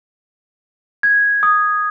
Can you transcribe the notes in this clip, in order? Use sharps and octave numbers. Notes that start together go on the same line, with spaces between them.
G#6
D#6